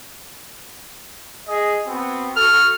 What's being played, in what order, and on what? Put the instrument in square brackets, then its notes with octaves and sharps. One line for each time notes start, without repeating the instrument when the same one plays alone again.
[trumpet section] G#4 D#5
B3 C4 F#4
[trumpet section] F#4 A4 C#6 [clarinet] F6